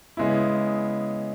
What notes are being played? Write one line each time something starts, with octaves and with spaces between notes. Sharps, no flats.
C#3 G#3 B3 E4